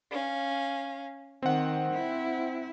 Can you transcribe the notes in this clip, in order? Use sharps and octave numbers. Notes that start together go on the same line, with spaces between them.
C#4 F5
D#3 C4 F#5
E4